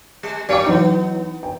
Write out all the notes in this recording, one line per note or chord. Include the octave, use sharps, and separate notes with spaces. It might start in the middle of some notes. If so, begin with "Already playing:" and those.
G3
F#3 C#5 D5 F5 D6
E3 F#3 B3 D#4
G5